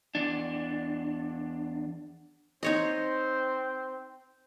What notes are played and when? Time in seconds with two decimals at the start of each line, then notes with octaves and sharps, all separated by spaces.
0.15 E2 D4
2.63 C4 D#4 C5 C#5 D#5